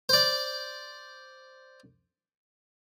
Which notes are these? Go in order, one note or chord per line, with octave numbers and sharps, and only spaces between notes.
C5 D5